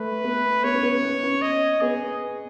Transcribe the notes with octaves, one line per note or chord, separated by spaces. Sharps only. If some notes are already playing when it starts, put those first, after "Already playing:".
Already playing: A3 B4
B3
B3 C#5
C#4
B3
C#4
C#4
D#5
B3 G#4